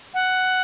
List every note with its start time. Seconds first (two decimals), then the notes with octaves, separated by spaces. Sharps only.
0.14 F#5